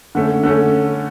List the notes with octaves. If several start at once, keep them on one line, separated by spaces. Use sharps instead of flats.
D3 A3 C#4
D3 A3 C#4